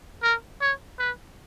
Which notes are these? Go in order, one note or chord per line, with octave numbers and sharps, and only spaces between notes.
A#4
C#5
B4